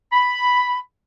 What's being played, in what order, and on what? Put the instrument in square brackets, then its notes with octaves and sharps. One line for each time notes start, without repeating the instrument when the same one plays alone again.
[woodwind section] B5